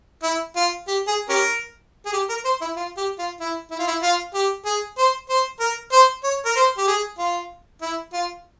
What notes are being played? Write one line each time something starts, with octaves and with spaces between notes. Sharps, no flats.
E4
F4
G4
G#4
C#4 G4 A#4
G#4
G4
A#4
C5
E4
F4
G4
F4
E4
E4
F4
E4
F4
G4
G#4
C5
C5
A#4
C5
C#5
A#4
C5
G4
G#4
F4
E4
F4